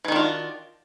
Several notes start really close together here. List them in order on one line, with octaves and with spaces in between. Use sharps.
E3 D#3 D4 F4 F#4